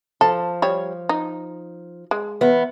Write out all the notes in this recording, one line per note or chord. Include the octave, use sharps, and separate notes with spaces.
F3 A4
G3 C#5
D#4
G#3
E2 B3